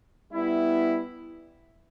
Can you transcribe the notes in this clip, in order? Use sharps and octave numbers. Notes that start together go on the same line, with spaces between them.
G3 B3 E4